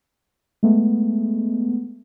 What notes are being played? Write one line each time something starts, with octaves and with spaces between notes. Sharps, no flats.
G#3 A3 B3